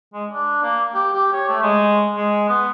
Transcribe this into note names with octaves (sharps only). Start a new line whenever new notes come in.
G#3
D4
A#3
G4
G4
C#5
A3
G#3
G#3
B3